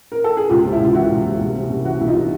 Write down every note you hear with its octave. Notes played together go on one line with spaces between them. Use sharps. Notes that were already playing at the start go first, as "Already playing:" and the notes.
A#4
A4
G#4
C#2 F4 G4
C3
E4
C#2 F4
E3 E4 F#4
C#2
C3
C2
C3
C2
E3 E4 F#4
C2 E4
D#4 F4
C3